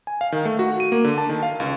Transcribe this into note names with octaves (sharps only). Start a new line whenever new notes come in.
G#5
F5
D#3
A3
F#4
D#7
A#3
D3
A5
D#3
F5
C#2